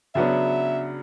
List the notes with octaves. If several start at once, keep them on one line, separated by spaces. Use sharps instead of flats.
C#3 F#3 B3 D4 E5